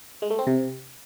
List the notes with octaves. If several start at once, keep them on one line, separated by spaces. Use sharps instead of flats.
G#3
A3
C4
C3